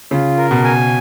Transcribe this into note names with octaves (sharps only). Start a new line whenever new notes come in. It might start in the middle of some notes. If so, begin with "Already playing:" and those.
C#3 F4
A#4
B2
G#5